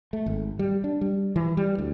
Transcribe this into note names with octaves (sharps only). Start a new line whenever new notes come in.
A3
G#1
G3
D4
G3
E3
G3
D2